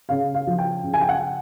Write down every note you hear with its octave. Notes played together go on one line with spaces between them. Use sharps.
C#3 F5
F5
F3
G5
C#3
G#5
G5
F#5